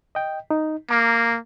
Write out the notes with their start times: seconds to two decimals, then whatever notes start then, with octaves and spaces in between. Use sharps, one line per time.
0.15 D#5 G5
0.51 D#4
0.90 A#3 A#5 D6 F6